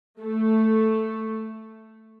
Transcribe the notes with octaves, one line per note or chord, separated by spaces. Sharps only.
A3